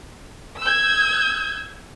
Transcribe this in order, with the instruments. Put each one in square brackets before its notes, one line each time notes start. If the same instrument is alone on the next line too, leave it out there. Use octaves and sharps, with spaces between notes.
[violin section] E6 G6 G#6